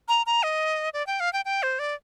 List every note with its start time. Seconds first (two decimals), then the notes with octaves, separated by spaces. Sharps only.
0.08 A#5
0.26 A#5
0.43 D#5
0.94 D5
1.07 G5
1.20 F5
1.33 G5
1.45 G5
1.63 C5
1.79 D5